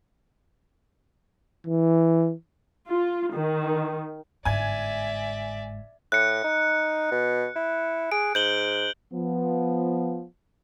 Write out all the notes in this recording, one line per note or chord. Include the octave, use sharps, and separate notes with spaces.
E3
F4
D#3
G1 G#2 D5 E5 G#5 G#6
A2 F#6 C#7
D#4
B2
E4
G#4 D7
G#2 G6 F#7 G7
F3 B3